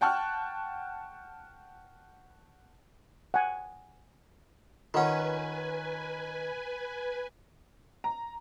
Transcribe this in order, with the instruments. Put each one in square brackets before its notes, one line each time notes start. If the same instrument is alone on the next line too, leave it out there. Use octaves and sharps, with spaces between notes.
[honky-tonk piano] F#5 G5 A5 C#6 F6 F#6
[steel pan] F#5 G#5
[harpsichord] D#3 C#4 [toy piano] F4 A4 F#5 [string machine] B4 G#5
[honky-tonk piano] A#5